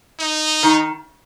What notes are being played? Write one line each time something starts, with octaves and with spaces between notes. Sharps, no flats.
D#4
D#3